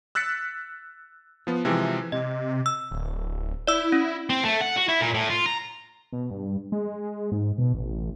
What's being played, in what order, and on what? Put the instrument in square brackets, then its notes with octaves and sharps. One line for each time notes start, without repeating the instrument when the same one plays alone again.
[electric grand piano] E6 F#6 A6 B6 C#7
F3 B3
C3 E3 F3 G#3 C4
[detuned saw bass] C3 [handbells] D#5
[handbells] E6
[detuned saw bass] D1
[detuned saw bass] E4 [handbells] D5 E6
[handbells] C#4
[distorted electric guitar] C4
A3
F#5
F#4
E4
A#2
A2
F4
A#5
[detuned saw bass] B2
G2
G#3
G#2
B2
A1